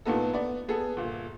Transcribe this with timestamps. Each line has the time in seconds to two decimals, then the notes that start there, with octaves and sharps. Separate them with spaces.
0.05 A#2 A3 B3 D#4 A4
0.33 B3 D5
0.68 B3 G#4 A4
0.97 G1 A#2